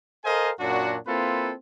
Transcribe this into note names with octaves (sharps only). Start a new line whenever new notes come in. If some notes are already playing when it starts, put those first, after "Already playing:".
A4 A#4 C5 D#5 F5 G#5
F#2 A#2 F#3 D4 F#4
A#3 C4 E4 F4 A4 B4